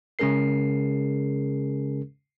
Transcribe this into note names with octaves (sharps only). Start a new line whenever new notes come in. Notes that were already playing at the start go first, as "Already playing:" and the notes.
C#3 G#3 C#4 G#4 A#4 C7